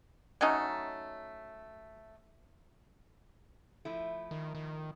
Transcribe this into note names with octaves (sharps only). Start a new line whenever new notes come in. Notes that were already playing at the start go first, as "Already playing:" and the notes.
F#3 A3 C#4 D#4
F3 A3 E4
D#3
D#3